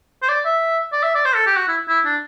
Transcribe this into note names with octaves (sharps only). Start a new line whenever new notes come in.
C5
D5
E5
D5
E5
D5
C5
A4
G4
F#4
E4
E4
D4